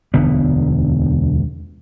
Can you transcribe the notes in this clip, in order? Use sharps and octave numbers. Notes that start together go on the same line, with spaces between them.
E1 D2 D3 B3